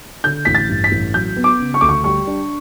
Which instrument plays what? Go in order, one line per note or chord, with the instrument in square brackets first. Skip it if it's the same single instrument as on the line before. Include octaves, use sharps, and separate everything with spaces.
[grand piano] D3 [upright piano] G6
[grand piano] A1 [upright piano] B6
[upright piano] A6
[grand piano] G2
[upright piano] B6
[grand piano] A1
[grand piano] F#3 [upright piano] G6
[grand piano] B3
[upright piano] D6
[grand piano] C#3
[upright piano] C#6
[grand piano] D2 [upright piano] D6
[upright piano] C#6
[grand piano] G3 [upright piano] C#6
[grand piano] D4